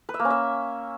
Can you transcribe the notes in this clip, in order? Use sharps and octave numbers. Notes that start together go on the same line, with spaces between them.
B4
E5
A#3
C#4
E5